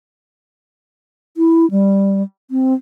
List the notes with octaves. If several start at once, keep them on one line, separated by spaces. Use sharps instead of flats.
E4
G3
C4